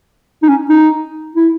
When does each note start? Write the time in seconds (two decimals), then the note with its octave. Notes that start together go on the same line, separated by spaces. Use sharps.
0.43 D#4
0.49 C#4
0.70 D#4
1.35 E4